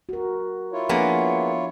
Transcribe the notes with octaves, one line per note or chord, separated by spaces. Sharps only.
F#4 A#4
E4 F4 C#5
F3 A#3 B3 D4 G#4